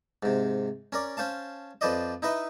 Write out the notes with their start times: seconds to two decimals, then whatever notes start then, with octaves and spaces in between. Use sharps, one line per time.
0.23 G#2 C3
0.92 C#4 A#4 D5
1.17 C#4 C5 F5 A5
1.81 F2 F3 B4 C5 D5 D#5
2.22 D#4 E4 B4 D#5 E5